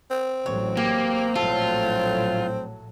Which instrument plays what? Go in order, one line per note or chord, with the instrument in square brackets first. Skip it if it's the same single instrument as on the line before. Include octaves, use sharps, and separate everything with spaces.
[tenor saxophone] C4
[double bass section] A1 F#3 [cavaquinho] C#5
[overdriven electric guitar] A#3 [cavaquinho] G4
[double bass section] A#1 A2 F#3 [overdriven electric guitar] F4 [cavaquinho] A4